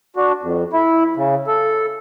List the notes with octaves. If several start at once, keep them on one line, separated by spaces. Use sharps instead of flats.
D4 F#4
F2
E4
C#3
A4